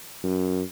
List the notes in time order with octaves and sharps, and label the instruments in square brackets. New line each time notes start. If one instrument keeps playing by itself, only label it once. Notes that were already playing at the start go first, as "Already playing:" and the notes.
[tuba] F#2